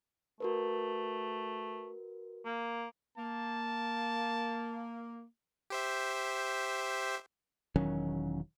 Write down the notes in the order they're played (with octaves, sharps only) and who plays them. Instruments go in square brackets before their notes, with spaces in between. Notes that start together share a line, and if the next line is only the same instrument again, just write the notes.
[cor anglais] A3 [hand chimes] F#4 A#4 B4
[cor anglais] A#3
[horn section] A#3 [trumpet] A5
[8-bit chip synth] G4 C5 E5
[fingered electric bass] E1 D#3 F#3 C#4